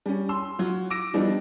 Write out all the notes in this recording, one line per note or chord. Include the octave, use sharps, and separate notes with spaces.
G3 C#4
C6 E6
F#3 F4
D6 E6 A#6 D7
E3 F3 G3 B3 D4 D#4